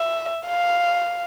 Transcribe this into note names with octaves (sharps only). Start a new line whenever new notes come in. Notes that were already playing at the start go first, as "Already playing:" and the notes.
Already playing: E5
F5